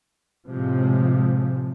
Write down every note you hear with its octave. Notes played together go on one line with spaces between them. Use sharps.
A2 C3 F3 G#3